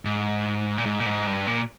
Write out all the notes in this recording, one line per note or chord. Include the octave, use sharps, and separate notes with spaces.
G#2
A#2
G#2
A#2
G#2
G2
A#2